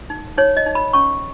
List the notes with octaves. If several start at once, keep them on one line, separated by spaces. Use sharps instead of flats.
D#4
D#4 C#5
D#5
D#4
B5
C#4 C#6